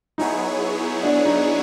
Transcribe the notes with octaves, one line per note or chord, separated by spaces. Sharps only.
F#3 B3 D#4 E4 G#4 C#5
D4
D#4